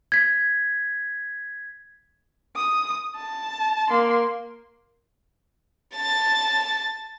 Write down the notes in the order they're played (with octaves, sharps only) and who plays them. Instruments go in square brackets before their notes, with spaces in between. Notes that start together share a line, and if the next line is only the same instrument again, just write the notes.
[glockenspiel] G#6 B6
[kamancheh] D#6
A5
A#3 C6
[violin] A5 A6